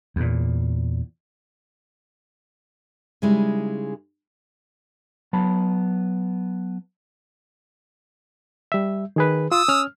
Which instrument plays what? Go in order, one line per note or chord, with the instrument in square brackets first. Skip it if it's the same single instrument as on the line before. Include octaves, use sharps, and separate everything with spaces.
[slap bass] E2 A#2
[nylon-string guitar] C#3 G3 G#3 D#4 E4
[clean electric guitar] F#3 B3 A5 B5
[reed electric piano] G3 E5
D#3 G#4 B4
[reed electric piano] F4 [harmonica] D#6 E6
[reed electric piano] C#4 F6